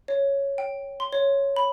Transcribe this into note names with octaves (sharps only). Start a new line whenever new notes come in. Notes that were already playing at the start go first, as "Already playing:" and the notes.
C#5
G5
C6
C#5
B5